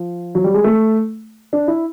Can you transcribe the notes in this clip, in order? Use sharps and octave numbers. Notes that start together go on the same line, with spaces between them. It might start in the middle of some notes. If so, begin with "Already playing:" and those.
Already playing: F3
F#3
G3
G#3
A3
D4
E4